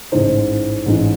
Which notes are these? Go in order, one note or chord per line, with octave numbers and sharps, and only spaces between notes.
A1 G#2 E3 C5
A1 G#2 E3